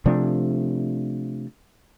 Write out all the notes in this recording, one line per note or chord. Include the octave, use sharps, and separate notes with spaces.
C3 F3 A3 D4